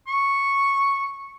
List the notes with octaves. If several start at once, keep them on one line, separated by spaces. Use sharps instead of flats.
C#6